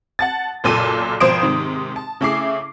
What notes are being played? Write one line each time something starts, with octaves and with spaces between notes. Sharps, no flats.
F#5 A5 A6
F#1 B1 A#2 A4 D#7
G#1 B2 F3 C5 D#6 D7
G#2 C3 D#3
A5
C#3 A3 E4 G#4 D6 C7